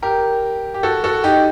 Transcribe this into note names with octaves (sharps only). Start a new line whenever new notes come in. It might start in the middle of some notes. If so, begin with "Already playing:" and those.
G4 A#4
G4
F#4 A4
F#4 A4
D#4 G4